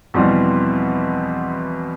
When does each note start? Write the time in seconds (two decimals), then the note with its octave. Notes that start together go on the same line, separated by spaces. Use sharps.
0.14 E2 B2 E3 F3 G3 C4